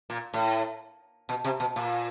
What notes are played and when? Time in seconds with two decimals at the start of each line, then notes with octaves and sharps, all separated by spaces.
0.10 A#2
0.34 A2
1.29 B2
1.44 C3
1.60 B2
1.76 A#2